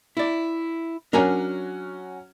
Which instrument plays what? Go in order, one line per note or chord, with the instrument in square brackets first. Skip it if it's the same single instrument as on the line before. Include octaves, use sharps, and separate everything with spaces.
[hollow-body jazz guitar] E4 D5
[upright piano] F#3 C#4 F#4 [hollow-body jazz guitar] D4 A#4 G#5